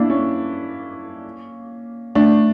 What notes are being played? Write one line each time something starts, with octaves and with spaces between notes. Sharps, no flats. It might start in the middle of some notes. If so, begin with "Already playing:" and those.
Already playing: A#3 D4 E4
C#4
A3 D4